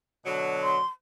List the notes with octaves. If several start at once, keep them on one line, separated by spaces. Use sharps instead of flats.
B2 D3 F#3
C6